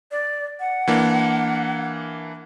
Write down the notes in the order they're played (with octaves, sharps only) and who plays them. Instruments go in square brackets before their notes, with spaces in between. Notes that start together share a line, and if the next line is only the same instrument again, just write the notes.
[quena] D5
F#5
[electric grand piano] E3 A#3 D4